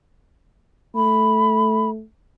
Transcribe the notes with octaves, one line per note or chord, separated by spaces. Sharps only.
A3 B5